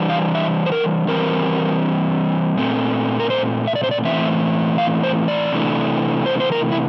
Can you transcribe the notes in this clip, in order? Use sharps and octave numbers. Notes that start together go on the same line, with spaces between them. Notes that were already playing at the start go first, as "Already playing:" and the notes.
Already playing: E3 G3 D4
F5
E5
C5
A#4
E3 G3 C4 A#4
A#2 A3 C4
A#4
C5
E5
D5
C5
D5
A2 E3 A3 C4 E5
F5
C5
D5
C3 E3 A3 D4
C5
C5
A#4
E4